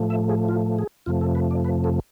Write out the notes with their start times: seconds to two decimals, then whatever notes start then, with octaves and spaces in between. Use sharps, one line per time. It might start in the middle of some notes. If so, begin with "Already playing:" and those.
Already playing: A2 F3 A3
0.10 E5
0.29 G#4
0.49 F4
0.79 G#4
1.06 F2 C3 F3 A3 F4
1.21 A4
1.35 B4
1.51 D5
1.64 B4
1.84 A4